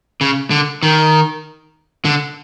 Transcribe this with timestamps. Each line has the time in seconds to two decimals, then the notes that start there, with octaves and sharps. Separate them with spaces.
0.21 C#3
0.51 D3
0.83 D#3
2.05 D3